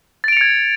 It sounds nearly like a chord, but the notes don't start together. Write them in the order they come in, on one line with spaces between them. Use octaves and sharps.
A6 D7 F7 C#7 G#6